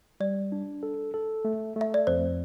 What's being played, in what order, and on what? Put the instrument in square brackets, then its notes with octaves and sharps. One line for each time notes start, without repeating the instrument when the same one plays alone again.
[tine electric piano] G3 [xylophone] D5
[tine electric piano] D4
A4
A4
A3
[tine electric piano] A3 [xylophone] E5
[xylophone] D5
[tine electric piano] F2 [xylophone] C5